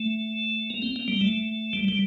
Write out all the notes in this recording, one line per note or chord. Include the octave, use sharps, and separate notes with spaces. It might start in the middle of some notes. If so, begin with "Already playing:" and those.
Already playing: A3
A#3
C4
A#3
G3
A3
G3
G3